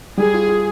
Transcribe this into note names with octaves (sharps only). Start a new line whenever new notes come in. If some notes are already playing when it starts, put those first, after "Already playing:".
G3 G#4
F4
F4